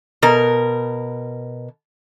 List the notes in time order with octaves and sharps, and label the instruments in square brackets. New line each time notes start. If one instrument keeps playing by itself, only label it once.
[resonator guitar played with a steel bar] B2 A#4